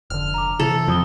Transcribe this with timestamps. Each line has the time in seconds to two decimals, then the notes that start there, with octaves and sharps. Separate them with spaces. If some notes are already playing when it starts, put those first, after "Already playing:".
0.10 F1 D3 F6
0.34 A#5 D6
0.59 C3 D#3 E3 A4
0.88 F2 F4 D#6 G7